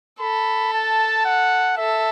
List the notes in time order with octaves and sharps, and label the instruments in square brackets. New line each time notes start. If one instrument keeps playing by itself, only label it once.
[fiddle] A4 [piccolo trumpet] B5
[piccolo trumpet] A5
F#5
[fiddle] A4 [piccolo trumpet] E5